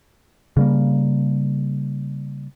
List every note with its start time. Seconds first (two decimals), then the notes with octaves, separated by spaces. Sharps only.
0.57 C#3 G3 A#3